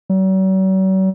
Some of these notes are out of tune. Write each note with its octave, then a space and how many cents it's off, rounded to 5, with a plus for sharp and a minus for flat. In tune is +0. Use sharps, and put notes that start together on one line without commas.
F#3 +45